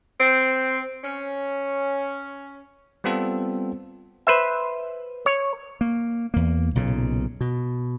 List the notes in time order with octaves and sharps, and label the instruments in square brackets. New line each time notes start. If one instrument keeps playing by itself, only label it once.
[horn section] C4
C#4
[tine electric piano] G3 B3 C4 F4 A4
[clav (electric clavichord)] B4 C5 E5
C#5
[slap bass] A#3
E2 A#3
B1 A#2 C#3
B2